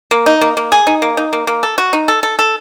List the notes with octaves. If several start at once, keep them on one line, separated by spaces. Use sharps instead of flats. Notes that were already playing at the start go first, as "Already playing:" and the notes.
A#3
D#4
A#3
A#3
G#4
D#4
A#3
D#4
A#3
A#3
A4
F#4
D#4
A4
A4
A4